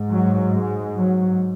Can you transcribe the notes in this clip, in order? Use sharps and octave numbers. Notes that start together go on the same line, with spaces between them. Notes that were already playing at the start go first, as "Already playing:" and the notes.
Already playing: G#2
F#3
G#3
F#3